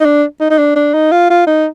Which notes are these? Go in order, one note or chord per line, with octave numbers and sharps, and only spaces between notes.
D#4
D4
D#4
D#4
D4
D4
D#4
F4
F4
D#4